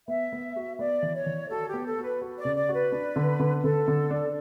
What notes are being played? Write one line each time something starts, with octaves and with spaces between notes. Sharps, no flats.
B3 E5
B3
F#4
B3 D5
E3
C#5
E3
F#4 A4
G4
B3
A4
F#4
B4
F#4
D5
C#3
D5
F#4
B4
D4
D3
D3
D3 A4
D3
D4